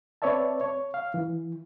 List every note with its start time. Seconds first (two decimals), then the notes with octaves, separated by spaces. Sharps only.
0.22 C4 B4 C#5 D5 E5 A5
0.61 C#5
0.94 F5
1.14 E3